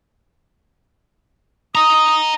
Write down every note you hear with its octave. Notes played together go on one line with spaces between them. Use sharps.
D#5 A#5 D#6